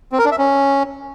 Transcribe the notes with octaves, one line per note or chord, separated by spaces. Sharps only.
C4
A#4
D4
E5
C#4